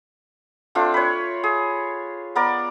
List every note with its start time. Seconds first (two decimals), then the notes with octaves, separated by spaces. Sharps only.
0.75 A3 C4 D4 F4
0.94 B4 C#5
1.44 G#4
2.35 B3 A#4 D5